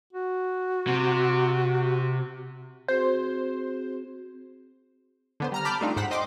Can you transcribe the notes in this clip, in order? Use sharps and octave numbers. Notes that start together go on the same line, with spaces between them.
F#4
C3
C4 F#4 G#4 C5
D3 B3 C5
G3 A#5 F6
A5 B5 D6 F6 G6
G3 A3 C4 D4 D#4 F4
G#2 C5 F#5 B6
C5 D#5 G5 C6 D6